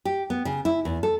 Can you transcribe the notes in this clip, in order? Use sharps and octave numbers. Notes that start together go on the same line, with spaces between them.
G4
B3
C#3
E4
E2
A4